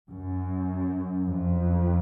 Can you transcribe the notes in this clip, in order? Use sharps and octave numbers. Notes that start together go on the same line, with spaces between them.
F#2
F2